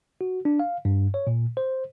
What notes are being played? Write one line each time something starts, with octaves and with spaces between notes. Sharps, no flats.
F#4
D4
F5
G2
C#5
A#2
C5